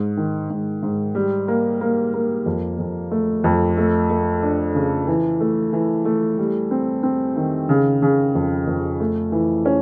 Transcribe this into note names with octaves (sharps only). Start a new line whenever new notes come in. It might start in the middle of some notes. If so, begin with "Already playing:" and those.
Already playing: G#2
D#3
G#2
G#2
G3
A#3
A#3
A#3
F2
F2
A3
F2
A3
A3
D4
C#3
E3
A3
E3
A3
G3
C4
C4
D#3
C#3
C#3
F2
F2
A3
E3
C#4